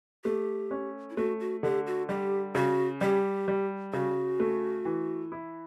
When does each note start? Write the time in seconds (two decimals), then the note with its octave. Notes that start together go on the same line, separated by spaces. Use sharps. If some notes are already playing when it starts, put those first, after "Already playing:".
0.24 A3 G4
0.71 C#4
1.10 E4
1.17 A3 F#4
1.40 F#4
1.63 D3 G4
1.87 F#4
2.09 G3 G4
2.55 C#3 F#4
3.01 G3 G4
3.48 G3
3.93 C#3 F#4
4.40 A3
4.85 E3
5.32 E4